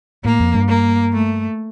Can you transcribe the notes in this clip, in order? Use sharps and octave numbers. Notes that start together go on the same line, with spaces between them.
A2 A#3
F2
G2
A#3
A3